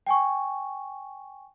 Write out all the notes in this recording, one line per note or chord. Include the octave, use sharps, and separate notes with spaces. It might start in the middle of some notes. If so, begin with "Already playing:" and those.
G5 G#5 C#6